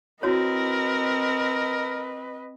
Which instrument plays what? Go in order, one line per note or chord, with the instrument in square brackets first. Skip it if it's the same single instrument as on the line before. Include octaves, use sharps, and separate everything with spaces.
[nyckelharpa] C4 [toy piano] E4 F#4 C#5 [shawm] A#4 [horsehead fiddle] B4 D#5